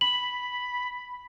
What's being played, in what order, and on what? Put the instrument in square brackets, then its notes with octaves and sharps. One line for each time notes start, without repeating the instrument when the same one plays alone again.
[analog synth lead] B5 [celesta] F#7